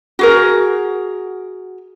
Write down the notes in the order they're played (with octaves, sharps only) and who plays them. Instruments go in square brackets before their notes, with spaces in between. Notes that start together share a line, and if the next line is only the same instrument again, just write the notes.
[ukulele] F#4 G#4 A#4